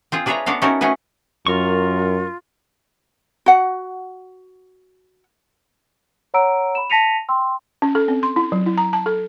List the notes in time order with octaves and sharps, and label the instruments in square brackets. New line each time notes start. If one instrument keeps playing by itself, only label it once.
[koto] C4 F4 G#4
D4 G#4 B4 C#5 E5 A#5
B3 D4 F#4 A4 F5
C#4 D#4 E4 F#4 A4 A#4
A3 C#4 F#4 G#4 B4
[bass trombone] F#2 [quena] F4 [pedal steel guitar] A#4 C#6
[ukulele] F#4 F#5
[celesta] C#5 F#5 A#5 E6 D7
B5 E7
A5 A#6 B6 C#7 D#7 F7
G5 C6 E6
[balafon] C#4
A4
C4
C6
E4
F#3
E4
A#5
A5
A4